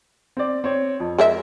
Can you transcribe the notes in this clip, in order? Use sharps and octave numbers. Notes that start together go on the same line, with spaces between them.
C4 D5
C4 C#5
F2
G#3 A#4 E5